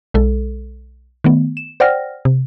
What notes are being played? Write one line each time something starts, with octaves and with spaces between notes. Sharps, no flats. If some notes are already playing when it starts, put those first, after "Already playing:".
B1 G#3 A4
D#3 A3 B3
E7
C5 D5 F#5 G5 F6 A#6
C3